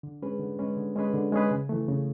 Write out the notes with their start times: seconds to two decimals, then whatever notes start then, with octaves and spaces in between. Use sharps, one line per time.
0.03 D3
0.22 G#3 C#4 G#4 B4
0.40 D3
0.59 G#3 C#4 G#4 B4
0.77 D3
0.96 G#3 C#4 G#4 B4
1.14 D3
1.32 G#3 C#4 G#4 B4
1.51 C#3
1.69 E3 A3
1.88 C#3